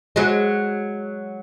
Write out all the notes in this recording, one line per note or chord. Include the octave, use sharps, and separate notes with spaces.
F#3 G#3